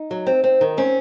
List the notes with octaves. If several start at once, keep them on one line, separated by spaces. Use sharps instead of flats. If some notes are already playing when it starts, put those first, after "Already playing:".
Already playing: D#4
F#3
C4
C4
D#3
C4 C#4